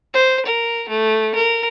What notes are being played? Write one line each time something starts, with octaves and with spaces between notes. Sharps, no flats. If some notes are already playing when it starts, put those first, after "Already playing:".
C5
A#4
A3
A#4